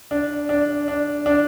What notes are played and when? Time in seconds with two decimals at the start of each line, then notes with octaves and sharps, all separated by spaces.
0.11 D4
0.49 D4
0.88 D4
1.26 D4